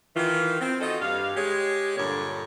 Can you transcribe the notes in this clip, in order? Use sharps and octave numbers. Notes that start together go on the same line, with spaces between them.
D#3 E3 F4
C4
F4 F#4 A4 D#5
G2 F5
G#3 G4 C#5
G2 A#2 D3 A#3 A4 C#5